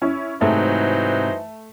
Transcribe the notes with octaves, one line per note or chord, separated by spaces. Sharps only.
C#4 E4
G#2 C3 E3 F#3 A3 D#4 C5